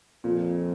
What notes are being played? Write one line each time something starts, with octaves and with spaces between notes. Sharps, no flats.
F2 A#2